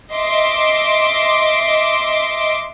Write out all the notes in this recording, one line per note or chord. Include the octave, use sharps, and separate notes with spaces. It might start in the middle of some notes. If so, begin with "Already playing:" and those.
D#5 E5 C6 D6